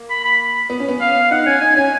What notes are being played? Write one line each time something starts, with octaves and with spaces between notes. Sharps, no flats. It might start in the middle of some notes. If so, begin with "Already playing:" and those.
Already playing: A#3
B5
B5
B3
C#4
B3
F5
D#4 F#5
C#4 G#5
D#4 G#5
C#4 G#5